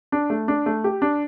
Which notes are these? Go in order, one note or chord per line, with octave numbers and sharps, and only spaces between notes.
D4
A3
D4
A3
G4
D4